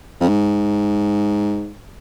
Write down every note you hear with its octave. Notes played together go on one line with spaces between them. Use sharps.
F2
G#2